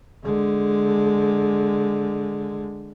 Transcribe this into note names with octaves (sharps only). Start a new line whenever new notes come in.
D3 G#3